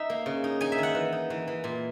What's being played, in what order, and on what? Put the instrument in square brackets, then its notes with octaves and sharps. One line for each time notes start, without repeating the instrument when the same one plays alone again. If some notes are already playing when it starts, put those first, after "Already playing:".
Already playing: [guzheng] D#4 E5
A#3
C#3
D#4
D#4 G#5
E5
D#3
F#5
E3
D#4
E3
E3
A#2